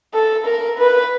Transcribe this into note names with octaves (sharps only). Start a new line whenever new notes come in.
A4
A#4
B4